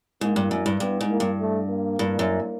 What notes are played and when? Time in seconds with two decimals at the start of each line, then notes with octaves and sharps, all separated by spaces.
0.21 G#2 A#3
0.36 G2
0.51 F#2
0.66 G2
0.80 G2 B3
1.01 G#2
1.10 A#3
1.20 G2
1.40 A3
1.70 A#3
1.99 G2
2.19 F#2